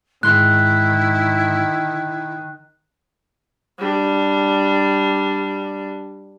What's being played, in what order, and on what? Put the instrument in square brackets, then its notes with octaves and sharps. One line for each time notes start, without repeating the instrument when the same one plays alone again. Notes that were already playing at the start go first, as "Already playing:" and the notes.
[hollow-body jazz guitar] G#2 C6 [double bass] D#3 [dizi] E4 [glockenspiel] F#6
[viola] G3 D4